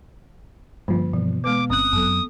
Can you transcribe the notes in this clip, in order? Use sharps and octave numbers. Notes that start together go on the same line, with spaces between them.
G2 D3 F3 A#3
B2 E3
G#3 B3 B4 D6
G1 C4 C#4 D#6 F#6
F#2 F#3 B3 A4